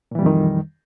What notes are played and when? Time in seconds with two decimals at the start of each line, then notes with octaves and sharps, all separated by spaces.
0.11 A#2
0.15 E3
0.19 G3
0.22 F2
0.26 D#3